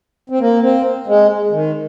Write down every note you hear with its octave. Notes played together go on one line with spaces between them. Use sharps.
C4
A#3
C4
G#3
D#3